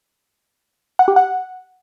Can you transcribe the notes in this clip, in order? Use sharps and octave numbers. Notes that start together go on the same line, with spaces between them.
F#5
G4
F#5